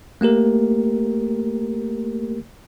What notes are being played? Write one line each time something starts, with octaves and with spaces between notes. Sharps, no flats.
A3 A#3 G4 A#4